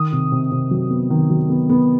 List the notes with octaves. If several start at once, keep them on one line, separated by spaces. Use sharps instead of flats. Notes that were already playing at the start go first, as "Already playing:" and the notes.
Already playing: D#3 D#6
C3
C3
C3
F#3
B3
D#3
F#3
B3
B3